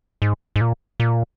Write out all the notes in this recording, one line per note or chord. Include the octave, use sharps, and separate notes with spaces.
G#2
G#2
A#2
A#2